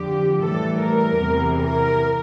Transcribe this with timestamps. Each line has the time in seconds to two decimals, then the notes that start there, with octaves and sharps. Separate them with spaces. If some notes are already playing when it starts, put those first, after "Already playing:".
Already playing: F2 D3 F3 G4
0.41 A2 E3 G3 A4
0.80 A#4
1.19 E2 C3 E3
1.58 A#4